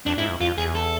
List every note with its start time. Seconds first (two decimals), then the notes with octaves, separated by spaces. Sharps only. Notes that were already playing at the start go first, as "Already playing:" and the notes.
0.06 F2 D4
0.18 G#2 E4
0.29 F2
0.41 F2 F4
0.58 E2 G#4
0.75 A4